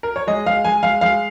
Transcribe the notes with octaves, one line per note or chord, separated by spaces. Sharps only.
A#4
C#5
G#3 D#5
G#3 F5
G#3 G#5
G#3 F5
G#3 F5